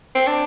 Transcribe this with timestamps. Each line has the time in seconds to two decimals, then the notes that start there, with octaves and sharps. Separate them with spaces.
0.15 C4
0.27 D4